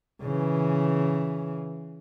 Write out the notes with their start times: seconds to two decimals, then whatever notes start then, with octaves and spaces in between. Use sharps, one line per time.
0.23 C#3 E3